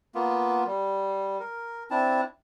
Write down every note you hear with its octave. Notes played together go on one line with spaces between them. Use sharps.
A#3 B3 F4
G3
A#4
C4 D4 E4 A5